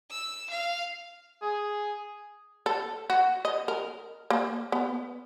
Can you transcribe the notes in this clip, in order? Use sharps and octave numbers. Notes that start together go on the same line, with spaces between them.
E6
F5
G#4
A4
F#4
D#5
A#4
A#3
B3